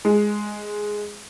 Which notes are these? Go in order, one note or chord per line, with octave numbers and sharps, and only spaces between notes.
G#3